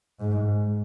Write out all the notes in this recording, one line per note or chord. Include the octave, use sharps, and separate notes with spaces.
G#2